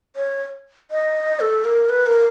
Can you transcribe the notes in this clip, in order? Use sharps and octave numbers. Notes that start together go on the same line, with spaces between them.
C#5
D#5
A4
A#4
B4
A#4